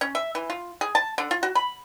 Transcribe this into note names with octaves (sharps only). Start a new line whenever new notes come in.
C#4
E5
E3
F4
G#4
A5
D3
F4
F#4
B5